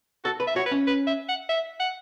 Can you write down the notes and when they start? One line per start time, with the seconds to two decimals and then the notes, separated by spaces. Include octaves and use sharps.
0.24 F#4 A4
0.40 B4
0.47 E5
0.56 F#4 C#5
0.66 B4
0.71 C#4
0.87 B4
1.07 E5
1.28 F#5
1.49 E5
1.79 F#5